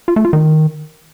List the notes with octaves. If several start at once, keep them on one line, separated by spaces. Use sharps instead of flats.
F4
A3
F4
D#3